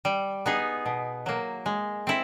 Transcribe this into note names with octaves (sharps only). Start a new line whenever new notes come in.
G3
B3 D#4 G#4
B2
F#3 A#3
G#3
C4 E4